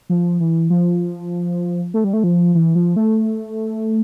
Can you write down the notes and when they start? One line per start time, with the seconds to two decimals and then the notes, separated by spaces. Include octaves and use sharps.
0.09 F3
0.40 E3
0.70 F3
1.94 A3
2.04 G3
2.13 A3
2.24 F3
2.55 E3
2.75 F3
2.96 A3